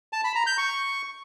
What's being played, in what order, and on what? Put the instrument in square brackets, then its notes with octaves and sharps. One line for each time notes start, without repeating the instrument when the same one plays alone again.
[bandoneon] A5
B5
A#5
G6
C#6